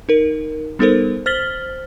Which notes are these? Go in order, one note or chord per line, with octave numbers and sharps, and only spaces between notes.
D#4 A#4
G3 B3 D#4 A4 A#4 C5
C5 F6 A6 B6 F#7 G7